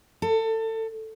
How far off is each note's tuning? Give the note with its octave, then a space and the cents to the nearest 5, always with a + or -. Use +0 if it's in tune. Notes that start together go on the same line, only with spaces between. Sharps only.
A4 +25